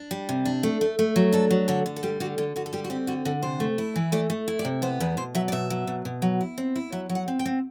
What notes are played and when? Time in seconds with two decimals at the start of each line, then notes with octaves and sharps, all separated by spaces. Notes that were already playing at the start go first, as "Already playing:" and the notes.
Already playing: D4
0.11 G3
0.29 C3
0.45 D4
0.63 A3
0.81 A3
0.99 A3
1.16 F#3
1.32 D4 A4
1.51 F#3
1.68 D3 A4
1.86 D3
1.96 A4
2.03 G3 G4
2.20 D3 F#4
2.38 D3 G4
2.56 D3 F#4
2.66 A4
2.73 G3 G4
2.84 F#4
2.90 C4 G4
3.07 D3 F#4
3.25 D3 A4
3.43 C3 C5
3.60 A3
3.78 E4
3.96 E3
4.12 A3 D5
4.30 A3
4.48 E4
4.59 D5
4.65 C3
4.82 B3 C5
5.00 E2 B4
5.17 B2 C5
5.35 F#3 E5
5.48 D5
5.52 B2 E5
5.70 F#3
5.87 B2
6.05 B2
6.22 F#3
6.41 E4
6.58 C4
6.76 E4
6.92 F#3 E5
7.09 F#3
7.15 F#5
7.28 C4
7.39 G5
7.46 C4